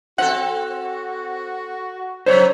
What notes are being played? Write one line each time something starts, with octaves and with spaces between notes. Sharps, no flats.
C4 F#4 A4 F#5
C#3 F#3 C5 C#5